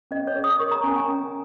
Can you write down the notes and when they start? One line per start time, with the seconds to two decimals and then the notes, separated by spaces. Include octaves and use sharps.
0.11 C#4 D#5
0.27 C#5
0.35 G#4
0.44 D#6
0.59 A#4 C#6
0.71 A#5
0.84 C#4 G#5
0.96 G#5
1.08 C#4